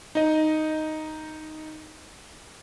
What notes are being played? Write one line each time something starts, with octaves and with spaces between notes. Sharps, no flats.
D#4 D#5